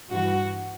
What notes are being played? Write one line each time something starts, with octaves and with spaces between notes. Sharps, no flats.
G2 E3 F#4